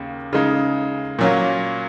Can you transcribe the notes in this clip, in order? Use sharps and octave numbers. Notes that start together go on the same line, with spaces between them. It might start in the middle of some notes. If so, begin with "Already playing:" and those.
Already playing: D#2 C#3 A#3
C#3 G#3 D#4
A#2 F#3 A#3 C#4